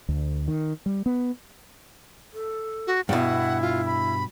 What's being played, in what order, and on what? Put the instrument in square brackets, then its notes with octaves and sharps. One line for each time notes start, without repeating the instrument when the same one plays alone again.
[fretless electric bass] D2
D#3
G3
B3
[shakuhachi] A4
[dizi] F#4
[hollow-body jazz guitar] G2 B2 [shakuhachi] E4 [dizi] F#5
[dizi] F4
B5